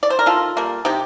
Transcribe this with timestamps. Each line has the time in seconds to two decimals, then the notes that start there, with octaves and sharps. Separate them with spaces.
0.03 D5
0.10 C5
0.19 A#4
0.26 D#3 F4 A4
0.57 G3 A#3
0.85 C3 D#4 G4